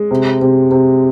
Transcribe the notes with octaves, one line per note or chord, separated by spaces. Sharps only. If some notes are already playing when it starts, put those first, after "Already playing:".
Already playing: G#3
C3
C3
C3